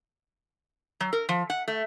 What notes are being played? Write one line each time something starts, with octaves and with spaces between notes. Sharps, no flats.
F#3
A#4
F3
F#5
A3